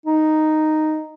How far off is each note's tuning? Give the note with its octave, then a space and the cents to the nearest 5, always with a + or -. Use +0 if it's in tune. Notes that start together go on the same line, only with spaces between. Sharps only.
D#4 -5